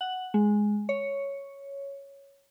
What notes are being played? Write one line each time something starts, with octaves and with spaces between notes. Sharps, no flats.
F#5
G#3
C#5